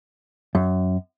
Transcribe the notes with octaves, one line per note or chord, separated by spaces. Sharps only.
F#2